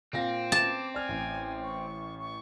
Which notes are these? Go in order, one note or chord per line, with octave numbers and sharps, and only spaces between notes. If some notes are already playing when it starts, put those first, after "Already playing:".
A#2 C4 F5 A#6
A5 D6
D5 G#5 F6
A1
C#6
C#6